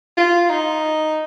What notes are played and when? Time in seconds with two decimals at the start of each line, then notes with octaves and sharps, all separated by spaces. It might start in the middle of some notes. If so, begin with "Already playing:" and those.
0.17 F4
0.50 D#4